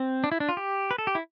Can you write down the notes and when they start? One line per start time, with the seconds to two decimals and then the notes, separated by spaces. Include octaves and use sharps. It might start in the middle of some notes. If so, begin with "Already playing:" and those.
Already playing: C4
0.24 D4
0.32 E4
0.40 D4
0.49 F4
0.57 G4
0.91 B4
0.98 A4
1.07 G4
1.15 E4